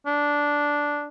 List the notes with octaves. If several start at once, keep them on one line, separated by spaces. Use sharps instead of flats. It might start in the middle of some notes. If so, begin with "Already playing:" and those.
D4